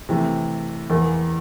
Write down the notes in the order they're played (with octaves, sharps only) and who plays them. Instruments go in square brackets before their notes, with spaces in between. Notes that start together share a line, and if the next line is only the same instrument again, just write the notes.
[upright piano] C3 E3 A3
E2 E3 A#3